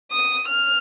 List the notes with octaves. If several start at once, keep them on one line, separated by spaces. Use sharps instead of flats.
D#6
F6